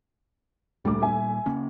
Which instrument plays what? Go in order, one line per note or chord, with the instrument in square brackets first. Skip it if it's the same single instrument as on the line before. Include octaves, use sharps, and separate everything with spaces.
[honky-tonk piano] D2 D6 [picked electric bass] A#2 G3
[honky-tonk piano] E5 G#5
[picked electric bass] C#3 A#3 C#4